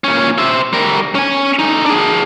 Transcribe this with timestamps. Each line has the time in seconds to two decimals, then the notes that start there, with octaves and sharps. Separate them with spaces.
0.04 A#2 C#4
0.38 C5 E5
0.73 G3 A#4
1.15 C#4 G#5
1.59 D3 D#4
1.86 D4 G#4